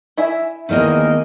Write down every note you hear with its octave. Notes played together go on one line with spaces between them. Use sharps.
E4 E5 G#5
E2 D#3 G#3 A#3 A#4 D#5